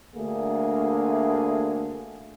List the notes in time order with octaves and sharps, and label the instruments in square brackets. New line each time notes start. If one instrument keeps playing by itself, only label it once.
[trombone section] D2 A3 A#3 D4 G#4